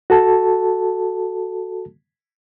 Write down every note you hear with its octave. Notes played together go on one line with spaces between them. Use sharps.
F#4 A4 A5